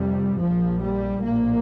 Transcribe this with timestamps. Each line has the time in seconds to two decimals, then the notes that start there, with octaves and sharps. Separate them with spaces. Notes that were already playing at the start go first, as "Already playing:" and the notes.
Already playing: F1 F2 C3 G3
0.40 A#1 A#2 F3
0.81 G3
1.23 A#1 A2 A#3